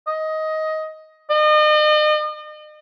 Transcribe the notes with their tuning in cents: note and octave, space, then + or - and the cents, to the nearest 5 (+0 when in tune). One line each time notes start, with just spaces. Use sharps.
D#5 +15
D#5 -40